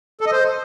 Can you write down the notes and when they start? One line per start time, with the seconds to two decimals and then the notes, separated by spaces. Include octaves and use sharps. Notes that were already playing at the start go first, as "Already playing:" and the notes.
0.21 A4
0.26 D#5
0.32 C5